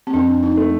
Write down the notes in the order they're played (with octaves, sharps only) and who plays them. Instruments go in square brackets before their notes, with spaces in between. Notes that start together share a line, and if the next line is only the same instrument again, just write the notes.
[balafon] C4
[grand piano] F2 [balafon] D4
[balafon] D#4
[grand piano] A3